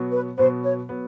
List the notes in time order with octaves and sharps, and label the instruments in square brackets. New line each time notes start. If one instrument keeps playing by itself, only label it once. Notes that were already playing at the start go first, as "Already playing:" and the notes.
Already playing: [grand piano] B2 F#3 B3
[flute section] B4
[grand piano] B2 F#3 B3 [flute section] C5
[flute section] C#5
[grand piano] F#3 B3